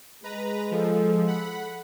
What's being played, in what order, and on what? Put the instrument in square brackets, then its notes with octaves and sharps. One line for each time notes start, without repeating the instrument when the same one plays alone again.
[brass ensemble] G#3 [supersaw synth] B4 A#5
[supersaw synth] F3 [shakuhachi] A4
[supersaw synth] F#5 B5